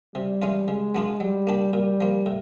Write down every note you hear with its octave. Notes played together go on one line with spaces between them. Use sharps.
C3 G3
E3 G#3 C#4 F4
C#3 G#3
F#3 B3 D4 F4
F#3 G3
A#3 D4 G4
A#2 G3
F3 A#3
A2